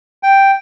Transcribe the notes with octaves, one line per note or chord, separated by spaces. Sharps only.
G5